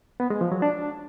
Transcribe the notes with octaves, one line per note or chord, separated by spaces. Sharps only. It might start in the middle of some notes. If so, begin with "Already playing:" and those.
B3
G#3
F3
F#3
D4